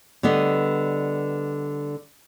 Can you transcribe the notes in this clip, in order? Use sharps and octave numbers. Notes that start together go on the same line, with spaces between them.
D3 G3 B3 D#5